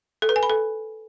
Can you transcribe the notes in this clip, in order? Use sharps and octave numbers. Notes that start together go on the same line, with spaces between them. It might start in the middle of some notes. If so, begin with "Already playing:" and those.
A4
B4
G#5
B5
A4